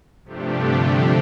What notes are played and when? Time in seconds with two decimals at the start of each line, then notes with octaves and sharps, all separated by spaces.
0.24 G2 C3 F3 A3 D4 G4
0.53 D3